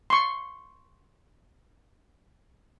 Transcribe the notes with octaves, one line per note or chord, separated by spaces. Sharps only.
C6 C#6